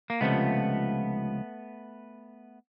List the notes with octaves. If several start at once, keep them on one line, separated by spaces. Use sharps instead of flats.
A#3
C#2 C3 F3 A3 B3